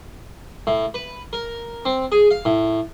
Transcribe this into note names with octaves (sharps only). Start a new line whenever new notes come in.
A2
B4
A#4
C4
G#4
F5
A2